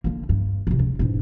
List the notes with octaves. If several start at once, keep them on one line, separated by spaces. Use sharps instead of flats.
D3 A#3
G2
A1 C3
C#2
E1 G#2